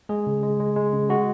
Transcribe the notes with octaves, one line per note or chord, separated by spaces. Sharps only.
G#3 G#4
C#3
G#3
G#3
G#3
C#3
G#3 F#4